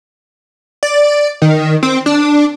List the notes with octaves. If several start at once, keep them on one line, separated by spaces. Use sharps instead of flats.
D5
D#3
C4
D4